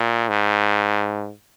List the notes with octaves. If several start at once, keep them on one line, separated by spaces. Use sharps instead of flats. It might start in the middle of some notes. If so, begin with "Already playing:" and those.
Already playing: A#2
G#2